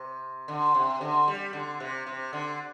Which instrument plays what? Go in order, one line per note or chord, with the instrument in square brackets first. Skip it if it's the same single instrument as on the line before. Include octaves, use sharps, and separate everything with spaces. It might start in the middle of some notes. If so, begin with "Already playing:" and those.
Already playing: [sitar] C3
D3
C3
D3
G3
D3
C3
C3
D3